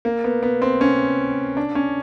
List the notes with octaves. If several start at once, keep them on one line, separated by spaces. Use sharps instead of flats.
A#3
B3
B3
C4
C#4
D4
C#4